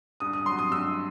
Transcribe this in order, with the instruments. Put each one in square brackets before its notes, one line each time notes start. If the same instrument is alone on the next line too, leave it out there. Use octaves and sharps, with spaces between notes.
[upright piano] G2 D#6
D#6
F#3 C6
D#6
G2 E6